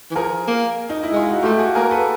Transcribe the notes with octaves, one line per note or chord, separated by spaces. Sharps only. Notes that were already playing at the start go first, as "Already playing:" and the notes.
E3
F3 G#4 A#4
A#3
D#4
E4
G#3 F4
F#4
A3 F4 G4
F#4 G#4
A#3 G#4 A#4
A4 B4